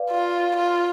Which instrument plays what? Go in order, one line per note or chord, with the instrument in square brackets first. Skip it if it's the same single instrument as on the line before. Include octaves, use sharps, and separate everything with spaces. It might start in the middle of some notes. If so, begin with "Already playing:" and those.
Already playing: [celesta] B4 D5 F5
[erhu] F4
F4